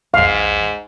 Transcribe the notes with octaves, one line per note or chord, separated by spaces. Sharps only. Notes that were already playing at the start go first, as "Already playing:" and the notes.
B1 E2 G#2 F5